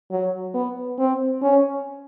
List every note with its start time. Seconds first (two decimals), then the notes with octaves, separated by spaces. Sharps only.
0.11 F#3
0.54 B3
0.99 C4
1.42 C#4